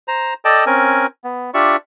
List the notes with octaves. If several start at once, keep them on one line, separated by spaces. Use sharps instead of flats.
C5 A#5
A4 D5 D#5 G5 A5
C4 C#4 A#4 G#5
B3
D4 F4 G4 D5 E5 C#6